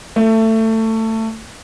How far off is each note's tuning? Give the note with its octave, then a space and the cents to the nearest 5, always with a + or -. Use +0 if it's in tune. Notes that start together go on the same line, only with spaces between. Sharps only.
A3 +20